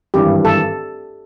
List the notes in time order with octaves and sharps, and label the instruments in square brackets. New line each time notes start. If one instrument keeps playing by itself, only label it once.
[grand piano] G#1 G2 E3 [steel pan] G4
[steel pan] A4